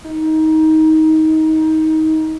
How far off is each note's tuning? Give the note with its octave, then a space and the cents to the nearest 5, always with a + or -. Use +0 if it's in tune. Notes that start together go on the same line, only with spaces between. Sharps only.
D#4 +20